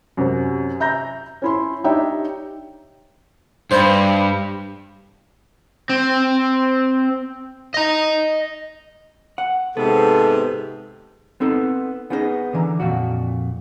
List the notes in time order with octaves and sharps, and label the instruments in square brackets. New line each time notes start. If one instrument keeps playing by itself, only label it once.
[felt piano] F#2 C3
E5 A#5 G6 A#6
C#4 E4 C6
D4 D#4 G4 C#5 E5 G5
[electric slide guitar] G2 [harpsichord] B4 C5
[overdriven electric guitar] C4
D#5 A#5
[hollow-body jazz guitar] F#5
[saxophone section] G#2 C3 [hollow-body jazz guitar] B3 [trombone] A4
[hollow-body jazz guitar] B3 C4 D#4 A4
B3 C#4 D#4 G#4 A#4 D#5
D3 E3 A#5
F2 A#2 F#4